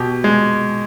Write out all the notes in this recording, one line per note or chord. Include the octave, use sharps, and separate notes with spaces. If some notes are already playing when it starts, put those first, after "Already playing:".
Already playing: B2 G4
G#3